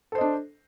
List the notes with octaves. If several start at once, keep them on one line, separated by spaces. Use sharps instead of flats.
D4 A4 C5 D#5